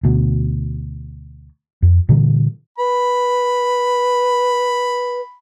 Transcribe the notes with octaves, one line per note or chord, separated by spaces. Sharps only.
D2 B2
F2
A#2 D3 E3 G3
B4 B5